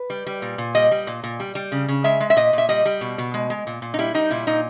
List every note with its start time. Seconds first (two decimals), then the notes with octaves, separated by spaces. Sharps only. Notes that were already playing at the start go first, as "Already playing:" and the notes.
Already playing: B4
0.10 G3
0.27 G3
0.42 A#2
0.58 A#2
0.75 G3 D#5
0.91 G3
1.07 A#2
1.24 A#2
1.40 G3
1.55 G3
1.72 C#3
1.88 C#3
2.04 G#3 E5
2.20 G#3
2.30 E5
2.36 A#2 D#5
2.53 A#2 E5
2.69 G3 D#5
2.85 G3
3.01 B2
3.18 B2
3.34 G#3
3.50 G#3
3.67 A#2
3.82 A#2
3.94 D#4
3.99 G3 E4
4.14 G3 D#4
4.30 A#2 E4
4.47 A#2 D#4